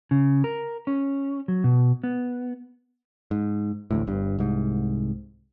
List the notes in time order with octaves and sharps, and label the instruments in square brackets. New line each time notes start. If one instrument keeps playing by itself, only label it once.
[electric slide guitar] C#3
A#4
C#4
F#3
B2
B3
[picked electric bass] G#2
A1 D2 A2
G1 G2
C2 G#2